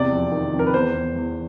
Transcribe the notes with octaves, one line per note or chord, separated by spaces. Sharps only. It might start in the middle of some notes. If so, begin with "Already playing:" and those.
Already playing: E2 C3 D5
F2
D#3
F2
A#4
B4
E2 C5
E2
E2